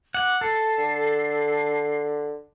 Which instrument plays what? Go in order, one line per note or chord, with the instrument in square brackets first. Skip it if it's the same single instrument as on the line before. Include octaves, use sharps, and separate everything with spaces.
[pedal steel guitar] F#5 [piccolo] D6
[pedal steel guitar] A4 [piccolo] C7
[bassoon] D3